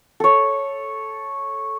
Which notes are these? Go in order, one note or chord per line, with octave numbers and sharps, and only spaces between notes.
A4 C#5